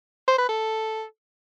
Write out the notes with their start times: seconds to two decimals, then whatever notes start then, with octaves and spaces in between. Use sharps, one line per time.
0.28 C5
0.38 B4
0.49 A4